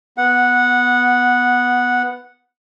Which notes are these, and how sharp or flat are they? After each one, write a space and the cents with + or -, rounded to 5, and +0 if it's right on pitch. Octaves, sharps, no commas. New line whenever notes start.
B3 +0 F#5 -10